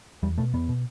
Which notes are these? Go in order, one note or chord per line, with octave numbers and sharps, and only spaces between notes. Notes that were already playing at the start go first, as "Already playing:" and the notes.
E2 G3
B2 A3
E2 B3
B2